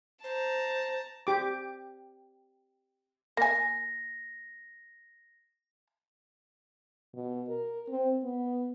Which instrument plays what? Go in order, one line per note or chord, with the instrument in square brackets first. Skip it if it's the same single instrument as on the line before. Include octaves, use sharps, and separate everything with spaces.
[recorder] C5 [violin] A5 A#5
[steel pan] G4 D6
[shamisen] A#3 G#5 [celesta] A#6
[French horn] B2
A#4
C4
B3